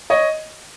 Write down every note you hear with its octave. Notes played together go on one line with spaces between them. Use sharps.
C#5 D#5